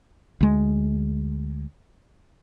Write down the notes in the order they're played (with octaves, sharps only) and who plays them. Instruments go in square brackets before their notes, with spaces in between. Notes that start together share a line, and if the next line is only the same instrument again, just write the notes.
[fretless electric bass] D2 G#3